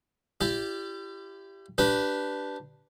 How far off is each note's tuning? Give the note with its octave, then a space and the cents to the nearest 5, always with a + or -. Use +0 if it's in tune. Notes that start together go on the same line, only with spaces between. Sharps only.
E4 +40 G4 +0 D5 +0
D4 +0 G4 -15 B4 +0